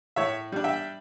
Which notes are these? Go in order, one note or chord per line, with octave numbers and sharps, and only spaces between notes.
A2 C#5 E5
G3 D4
E5 G5